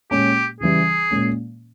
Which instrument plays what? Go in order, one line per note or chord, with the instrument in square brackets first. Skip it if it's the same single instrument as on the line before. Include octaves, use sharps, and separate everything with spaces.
[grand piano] A#2 G#3 C#4 [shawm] G4
[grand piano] C#3 E3 G3 [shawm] G#4
[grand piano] A#2 G#3 C#4